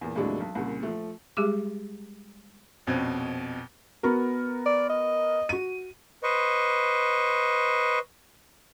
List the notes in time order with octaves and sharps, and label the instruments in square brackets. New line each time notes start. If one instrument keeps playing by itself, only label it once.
[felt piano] E2 A#2
D#2 A2 C3 F#3 G#3 D4
B1
C2 A#2 C#3
F3 A3
[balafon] G3 G#3 G4 G#4 D6
[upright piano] A#1 F2 B2 C4 C#4 G#6
[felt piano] B3 F#4 A#4
[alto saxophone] D5
D#5
[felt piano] F#4 D#7
[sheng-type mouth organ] B4 C5 D#5 C#6